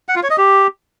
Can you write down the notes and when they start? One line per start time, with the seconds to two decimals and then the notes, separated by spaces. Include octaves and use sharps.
0.09 F#5
0.16 F4
0.23 C#5
0.30 D#5
0.38 G4